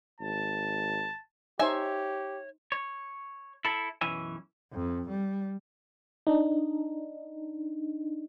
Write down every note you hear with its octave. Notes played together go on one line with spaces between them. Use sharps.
G#1 A5
D#4 G4 C5 C#5 E5 G#5
C#5
E4 A4
B1 F#2 E3 C#4 E5 G#5
F2
G3
D4 D#4